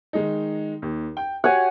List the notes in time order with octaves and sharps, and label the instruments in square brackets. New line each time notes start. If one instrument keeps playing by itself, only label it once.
[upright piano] D#3 G#3 D#4
D#2
G5
[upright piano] F#4 G4 C#5 [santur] F#5 G#5